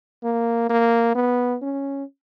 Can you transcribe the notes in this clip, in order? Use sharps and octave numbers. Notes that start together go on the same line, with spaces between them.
A#3
A#3
B3
C#4